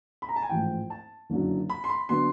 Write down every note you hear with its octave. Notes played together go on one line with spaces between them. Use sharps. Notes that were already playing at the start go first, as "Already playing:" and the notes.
B5
A#5
A5
G#5
A1 G#2 F3 A3 G5
A5
F#1 F#2 D3 F#3
B5
C6
B5
D3 F#3 B3 C6